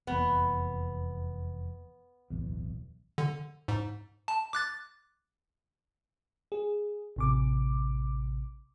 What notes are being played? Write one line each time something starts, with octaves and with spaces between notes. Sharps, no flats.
F1 E2 A#3 B3
D1 B1 E2
D3
G#2
A5
D6 F#6 A6
G#4
A1 C3 D6